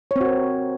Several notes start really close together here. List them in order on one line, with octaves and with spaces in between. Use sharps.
C#5 C4 F#4 A#4